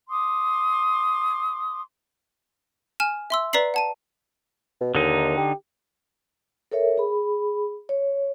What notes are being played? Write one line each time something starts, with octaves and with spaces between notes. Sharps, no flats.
C6 D6 D#6
G#5 F6 E7
E5 C6 E6
B4 D5 A#5 B6 C7 F#7
F#5 A5 D#7
B2
D#2 D3 D#4
G4
A4 A#4 C#5 E5
G#4 B5
C#5